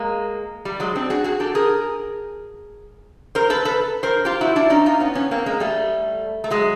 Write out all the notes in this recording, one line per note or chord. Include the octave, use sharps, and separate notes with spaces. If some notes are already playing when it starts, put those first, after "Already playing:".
Already playing: G#3 A#3
G3
F#3 G#3
C4 D4
F#4 G#4
F#4 G#4
G4 A4
G#4 A#4
A#4 C5
A4 B4
A4 B4
A#4 C5
F4 G4
E4 F#4
D4 E4
C#4 D#4
D#4 F4
B3 C#4
B3 C#4
A#3 C4
G#3 A#3
G3 A3
A3
F#3 G#3